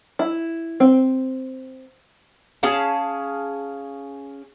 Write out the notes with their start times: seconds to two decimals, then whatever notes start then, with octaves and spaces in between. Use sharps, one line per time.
0.19 E4
0.80 C4
2.63 C#4 G#4 F5 A5